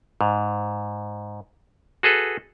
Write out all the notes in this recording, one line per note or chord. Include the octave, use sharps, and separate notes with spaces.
G#2
F#4 G#4 A4 B4